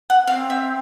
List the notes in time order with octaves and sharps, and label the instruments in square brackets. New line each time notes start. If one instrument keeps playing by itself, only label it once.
[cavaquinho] F#5
[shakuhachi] C4 [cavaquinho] F5
[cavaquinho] E5